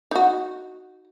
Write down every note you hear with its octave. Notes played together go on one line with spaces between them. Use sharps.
D#4 F#4